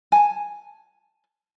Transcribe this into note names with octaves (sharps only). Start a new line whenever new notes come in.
G#5 A5